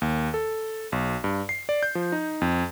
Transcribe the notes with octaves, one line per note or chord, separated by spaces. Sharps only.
D#2
A4
B1
G2
C7
D5
G6
F3
D#4
F2